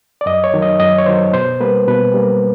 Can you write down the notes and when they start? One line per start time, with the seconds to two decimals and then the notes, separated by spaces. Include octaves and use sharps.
0.21 D5
0.26 F#2 D#5
0.44 C#5
0.54 D#3 F#3
0.62 D#5
0.80 F#2 D#5
0.98 C#5
1.06 D#3 F#3 C5
1.33 B2 C5
1.61 G3 A#3 B4
1.87 B2 B4
2.14 G3 A#3